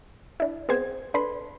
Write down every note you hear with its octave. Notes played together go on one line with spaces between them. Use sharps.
D4 E4
B3 C4 G#4 C5 G#6
D4 A4 B4 B5 C6